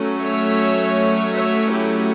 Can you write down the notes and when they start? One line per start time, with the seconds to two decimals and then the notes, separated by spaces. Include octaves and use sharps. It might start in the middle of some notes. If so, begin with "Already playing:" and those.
Already playing: F#3 A3 C#4
0.22 C#5 E5
1.33 C#5 E5
1.70 E4 G4